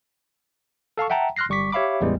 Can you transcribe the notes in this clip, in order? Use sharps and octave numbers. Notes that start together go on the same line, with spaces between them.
A4 F5 A5 C#6
E5 F#5 G5 A5 A#5
C6 F6 F#6 A#6 C7
G1 G3 C#6 D6 B6
G4 C#5 E5 F5 B5 D6
A1 E2 E3 G3 G#3